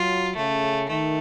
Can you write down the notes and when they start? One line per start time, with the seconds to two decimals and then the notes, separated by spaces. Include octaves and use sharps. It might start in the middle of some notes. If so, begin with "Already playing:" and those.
Already playing: F#3 F4
0.36 C#3 A3
0.89 D#3 A3